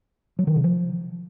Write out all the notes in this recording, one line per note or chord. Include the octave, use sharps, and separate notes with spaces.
F#3
D#3
C3
F3